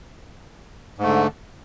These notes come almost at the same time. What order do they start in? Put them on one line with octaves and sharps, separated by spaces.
G#2 A3 D3